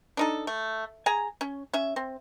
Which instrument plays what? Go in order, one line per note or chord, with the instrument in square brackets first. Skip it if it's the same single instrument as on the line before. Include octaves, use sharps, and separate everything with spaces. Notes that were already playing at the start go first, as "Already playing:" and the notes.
[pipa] D4 D#4 A4
A3
G#4 G#5 A#5
C#4
C#4 E5
C4